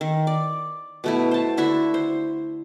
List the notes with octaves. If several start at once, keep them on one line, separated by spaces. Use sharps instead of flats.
D#3
D5
B2 A3 E4
C5 A5
D3 E4 F#4 E5
C5